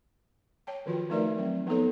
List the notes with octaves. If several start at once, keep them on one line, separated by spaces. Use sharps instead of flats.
C#5 G5 A5
D#3 F3 F4 F#4
F3 A3 D#4 A#4 D5 E5
F#3 C4
F3 B3 D#4 A4 C#5